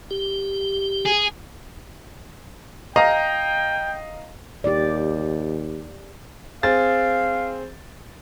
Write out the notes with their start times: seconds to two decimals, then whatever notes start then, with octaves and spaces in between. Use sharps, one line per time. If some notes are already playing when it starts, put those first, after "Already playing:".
0.11 G4
1.05 G#4
2.96 D#5 F5 G5 A#5
4.64 D#2 G4 D5
6.63 C4 G#4 F5 A6